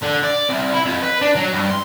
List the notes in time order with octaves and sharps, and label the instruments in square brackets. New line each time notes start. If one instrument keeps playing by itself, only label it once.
[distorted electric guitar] D3
D5
C2
E4
F2
B4
D4
F#3
G2
C6